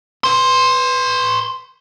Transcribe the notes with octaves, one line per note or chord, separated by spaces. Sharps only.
B4 C6